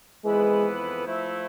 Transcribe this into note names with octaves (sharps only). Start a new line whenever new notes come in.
F2 E3 G#3 B3 E4 B4
F3 A3 E4